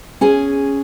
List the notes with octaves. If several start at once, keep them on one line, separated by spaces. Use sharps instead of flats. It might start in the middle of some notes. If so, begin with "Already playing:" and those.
C#4 G#4 G#5